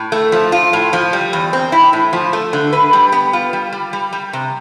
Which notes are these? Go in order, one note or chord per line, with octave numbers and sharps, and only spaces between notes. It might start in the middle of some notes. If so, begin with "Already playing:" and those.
Already playing: A2
A3
F3
F4
A2
F3
G3
E2
C4
E4
A2
F3
A3
D3
B4
G3
B3
F4
G3
G3
G3
G3
C3